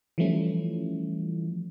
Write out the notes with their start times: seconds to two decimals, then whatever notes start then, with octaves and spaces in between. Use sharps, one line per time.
0.18 E3 F3 G3 A3 C#4 E4